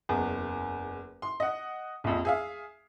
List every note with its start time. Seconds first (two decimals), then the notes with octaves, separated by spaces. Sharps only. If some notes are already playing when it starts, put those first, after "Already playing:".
0.09 F#1 E2
1.22 C6
1.40 D#5 F#5
2.04 A#1 F2
2.25 G#4 E5 F5